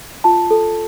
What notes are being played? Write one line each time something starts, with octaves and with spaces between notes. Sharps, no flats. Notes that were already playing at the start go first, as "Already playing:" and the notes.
F4 A5
A4